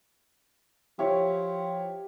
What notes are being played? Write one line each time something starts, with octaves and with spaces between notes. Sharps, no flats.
F3 E4 G4 C#5